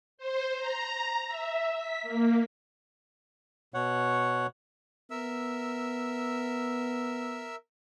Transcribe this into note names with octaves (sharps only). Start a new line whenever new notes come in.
C5
A#5
E5
B6
A#3
B2 C#5 F#5
B3 A#4 E5 E6